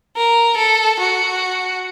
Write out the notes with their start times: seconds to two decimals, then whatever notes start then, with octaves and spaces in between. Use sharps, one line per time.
0.16 A#4
0.57 A4
0.99 F#4